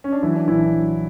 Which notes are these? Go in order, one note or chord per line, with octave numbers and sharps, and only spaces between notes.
C#4
D4
E3 F#3 E4
D4
A#1 E3 E4
D4
F#3